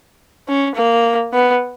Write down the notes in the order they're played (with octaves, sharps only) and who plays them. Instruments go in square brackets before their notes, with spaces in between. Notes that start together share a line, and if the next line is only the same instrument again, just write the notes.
[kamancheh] C#4
A#3
B3